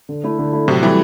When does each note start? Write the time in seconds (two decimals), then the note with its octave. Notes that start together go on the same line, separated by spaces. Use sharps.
0.09 D3
0.24 A3 E4
0.39 D3
0.53 A3 E4
0.67 A2 C3 F#3
0.83 E3 G3 A3 C4 E4